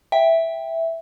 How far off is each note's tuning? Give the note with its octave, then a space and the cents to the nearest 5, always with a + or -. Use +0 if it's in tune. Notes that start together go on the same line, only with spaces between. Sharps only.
E5 +0 G5 +10